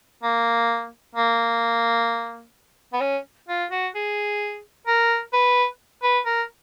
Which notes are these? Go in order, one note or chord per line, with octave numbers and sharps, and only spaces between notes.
A#3
A#3
B3
C#4
F4
F#4
G#4
A#4
B4
B4
A#4